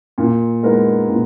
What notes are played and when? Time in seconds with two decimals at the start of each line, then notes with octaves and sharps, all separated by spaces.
0.18 A#2
0.63 G#3 B3 D#4 A#4
1.09 A#2